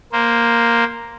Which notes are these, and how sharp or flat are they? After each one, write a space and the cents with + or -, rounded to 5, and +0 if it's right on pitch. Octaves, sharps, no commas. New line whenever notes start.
A#3 +0 C5 +0